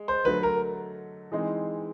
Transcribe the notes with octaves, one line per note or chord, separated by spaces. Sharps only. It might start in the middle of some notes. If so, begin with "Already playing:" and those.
Already playing: G#3
C5
D3 F#3 A3 B4
A#4
E3 G#3 C4 D#4